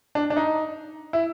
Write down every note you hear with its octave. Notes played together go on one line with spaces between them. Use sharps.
D4
D4
D#4
E4